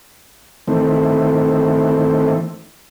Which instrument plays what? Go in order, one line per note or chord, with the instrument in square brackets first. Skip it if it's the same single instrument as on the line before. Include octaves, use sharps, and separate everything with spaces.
[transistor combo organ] D#3 E3 A3 C4